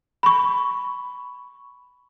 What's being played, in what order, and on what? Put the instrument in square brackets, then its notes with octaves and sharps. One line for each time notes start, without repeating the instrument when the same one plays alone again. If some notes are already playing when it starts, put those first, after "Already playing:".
[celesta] B5 C#6